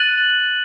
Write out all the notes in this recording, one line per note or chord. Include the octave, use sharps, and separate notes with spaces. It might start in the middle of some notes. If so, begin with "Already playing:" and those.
Already playing: F#6 A6 D#7 F#7